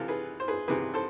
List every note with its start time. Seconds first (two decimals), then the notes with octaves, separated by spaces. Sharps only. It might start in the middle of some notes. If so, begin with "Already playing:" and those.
Already playing: C3 E3 F4 A4
0.08 G#4 B4
0.40 C5
0.48 G#4 B4
0.68 C3 E3 G#4 B4
0.94 A4 C5